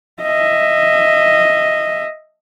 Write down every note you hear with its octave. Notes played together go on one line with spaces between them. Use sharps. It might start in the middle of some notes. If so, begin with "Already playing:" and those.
D#5 E5